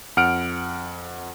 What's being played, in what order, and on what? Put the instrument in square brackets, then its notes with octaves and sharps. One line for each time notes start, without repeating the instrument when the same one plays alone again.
[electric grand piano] F2 F#5 F6 D7